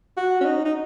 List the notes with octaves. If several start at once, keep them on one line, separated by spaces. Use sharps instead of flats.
F#4
C#4
D#4
D#4